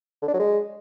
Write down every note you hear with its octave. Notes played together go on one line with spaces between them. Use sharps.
D3
D4
F#3
G#3